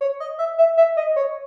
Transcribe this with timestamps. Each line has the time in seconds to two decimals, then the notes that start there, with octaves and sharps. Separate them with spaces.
0.01 C#5
0.20 D#5
0.38 E5
0.58 E5
0.77 E5
0.97 D#5
1.16 C#5